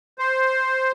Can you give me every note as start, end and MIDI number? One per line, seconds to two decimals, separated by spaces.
0.19 0.92 72